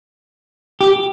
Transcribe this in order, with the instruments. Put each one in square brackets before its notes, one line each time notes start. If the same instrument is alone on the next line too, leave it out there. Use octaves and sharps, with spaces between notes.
[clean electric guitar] G4